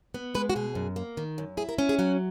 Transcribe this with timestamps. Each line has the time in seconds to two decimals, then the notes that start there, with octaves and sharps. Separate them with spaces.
0.14 B3
0.35 G#3 B4
0.50 F#4
0.56 B2 G#4
0.75 F#2
0.96 A#3
1.17 D#3
1.38 F#2
1.57 E4 G#4
1.69 A#4
1.78 C#4
1.89 G#4
1.99 F#3 F#4